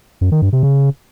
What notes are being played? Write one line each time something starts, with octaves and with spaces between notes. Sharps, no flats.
F#2
D#3
G2
C3
C#3